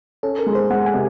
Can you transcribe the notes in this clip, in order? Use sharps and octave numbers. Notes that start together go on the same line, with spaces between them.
C#4 A4
A#4
G#3
C5
G#3 F#5
G#5
C3